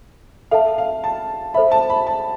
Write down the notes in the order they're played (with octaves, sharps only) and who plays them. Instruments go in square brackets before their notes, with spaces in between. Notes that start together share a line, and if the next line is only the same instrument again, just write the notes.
[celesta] A4 E5 A5 [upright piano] F5
[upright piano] F5
A5
[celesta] A4 C5 E5 [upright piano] B5
[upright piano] A5
B5
A5